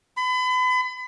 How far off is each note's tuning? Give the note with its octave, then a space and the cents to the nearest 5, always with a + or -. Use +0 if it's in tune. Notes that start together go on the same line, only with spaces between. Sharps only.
B5 +35